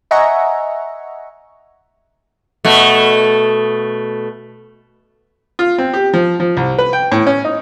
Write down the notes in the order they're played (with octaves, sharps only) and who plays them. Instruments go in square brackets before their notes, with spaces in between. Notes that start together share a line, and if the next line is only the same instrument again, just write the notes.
[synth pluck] D#5 E5 F#5 G#5 A#5 C#6
[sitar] B2 A3
[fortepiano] F4
C4
G4
F3
F3
C2
B4
G5
A2
C#4
D#4